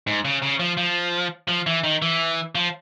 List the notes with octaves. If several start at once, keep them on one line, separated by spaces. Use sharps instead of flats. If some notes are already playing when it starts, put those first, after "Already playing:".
G#2
C#3
C#3
F3
F3
F3
E3
D#3
E3
F3